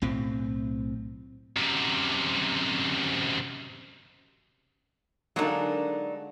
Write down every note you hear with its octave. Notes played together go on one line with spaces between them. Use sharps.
B1 A2 C4
F#2 C3
D3 F#3 G#3 A#3 D4 D#4